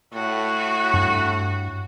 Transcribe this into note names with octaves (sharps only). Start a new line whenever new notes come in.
A2 F#4
G2